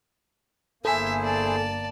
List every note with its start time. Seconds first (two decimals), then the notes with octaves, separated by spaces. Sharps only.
0.85 G1 A#3 E4 G#4 A4 C5 E5 G#5
1.23 D5 A5